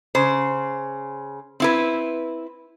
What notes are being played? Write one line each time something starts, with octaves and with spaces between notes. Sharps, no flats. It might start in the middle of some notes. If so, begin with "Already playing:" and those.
C#3 C5
C4 E4 B4